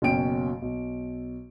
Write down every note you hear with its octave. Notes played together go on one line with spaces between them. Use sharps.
F#1 B2 C#4 G5 D7
B1